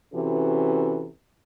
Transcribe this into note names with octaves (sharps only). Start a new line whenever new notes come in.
C3 E3 C#4 F#4 A4 B4